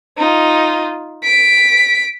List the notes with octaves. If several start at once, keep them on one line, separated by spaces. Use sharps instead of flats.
D#4 F4
B6 D7